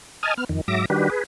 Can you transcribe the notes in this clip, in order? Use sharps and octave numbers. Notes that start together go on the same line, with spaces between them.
D#5 G#5 A5 D#6 F6
B3 F6
F2 D#3
G#2 F#3 E5 D6 A#6
D#3 G3 D4 F#4 G4 B4
G#4 B4